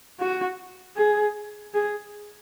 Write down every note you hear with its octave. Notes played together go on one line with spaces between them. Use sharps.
F#4
G#4
G#4